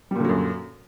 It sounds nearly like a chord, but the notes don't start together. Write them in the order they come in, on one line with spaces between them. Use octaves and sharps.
G3 A#2 D3 F#3 F#2